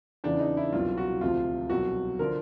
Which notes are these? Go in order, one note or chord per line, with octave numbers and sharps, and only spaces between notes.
E2 C#3 E3 D4
D#4
E4
C2 B2 F#3 F4
F#4
D2 C3 F3 F4
C2 B2 F#3 F#4
D3 F3 A#4